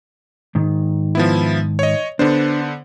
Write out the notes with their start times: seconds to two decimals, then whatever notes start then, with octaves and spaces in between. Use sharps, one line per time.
0.55 G#2 D#3
1.15 F3 B3 E4
1.79 C#5 D#5
2.19 D3 B3 D4 C5